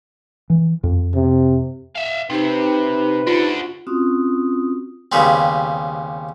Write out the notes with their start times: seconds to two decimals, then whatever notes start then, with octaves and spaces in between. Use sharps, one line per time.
0.50 E3
0.83 F2
1.15 C3
1.96 E5 F5
2.30 C3 D#4 G4 B4 C5
3.27 D4 F4 F#4
3.87 C4 C#4 F4 F#4 D#6
5.12 D#2 C#3 G3 B3 C4